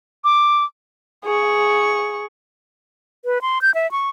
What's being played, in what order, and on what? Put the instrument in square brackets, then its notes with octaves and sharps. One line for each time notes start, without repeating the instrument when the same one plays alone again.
[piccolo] D6
[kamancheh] G#4 C#6
[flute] B4
C6
G6
E5
C#6